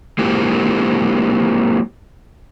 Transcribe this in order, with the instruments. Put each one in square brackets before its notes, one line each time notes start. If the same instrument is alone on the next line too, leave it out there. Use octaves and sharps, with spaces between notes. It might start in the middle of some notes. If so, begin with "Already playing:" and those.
[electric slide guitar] F#3 G#3 A#3 C4 E4 G4